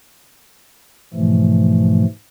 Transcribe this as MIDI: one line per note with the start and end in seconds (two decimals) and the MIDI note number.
1.14 2.05 44
1.14 2.05 47
1.14 2.05 52
1.14 2.05 53
1.14 2.05 57